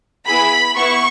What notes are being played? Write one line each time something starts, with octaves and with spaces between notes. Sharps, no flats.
B3 E4 G#4 B5
B3 E4 C#6